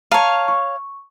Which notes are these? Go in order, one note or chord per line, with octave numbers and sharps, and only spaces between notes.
C#5 F5 A5 A#5 D#7
C#6